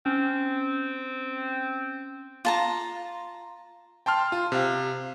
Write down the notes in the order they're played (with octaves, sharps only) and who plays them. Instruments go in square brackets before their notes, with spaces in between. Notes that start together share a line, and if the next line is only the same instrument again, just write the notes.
[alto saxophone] C4 [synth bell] C#4
[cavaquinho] F4 A5 A#5
[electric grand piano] G5 A5 C6 F6
F4
C3 F5